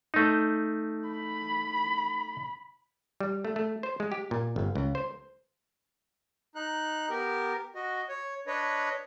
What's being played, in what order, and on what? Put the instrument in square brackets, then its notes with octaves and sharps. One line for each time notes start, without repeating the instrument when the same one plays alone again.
[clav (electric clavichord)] A3 D#4
[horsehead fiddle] B5
[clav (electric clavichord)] G3
A3
A3
C5
G#3
G4
A#2
G1
C#2
C5
[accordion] D#4 F#6
B3 G4 A#4
F#4 D#5
C#5
D4 B4 C#5 D#5